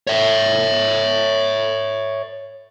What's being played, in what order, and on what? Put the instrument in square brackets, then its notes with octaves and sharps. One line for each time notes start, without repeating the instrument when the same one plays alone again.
[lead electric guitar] C#5 E5